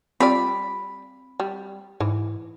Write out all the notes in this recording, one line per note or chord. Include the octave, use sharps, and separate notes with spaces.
G3 C4 F4 D5 B5
G3
G#2 E3